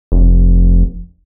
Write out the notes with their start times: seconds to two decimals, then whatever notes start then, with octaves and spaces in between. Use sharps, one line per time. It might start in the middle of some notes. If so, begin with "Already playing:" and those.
0.12 F1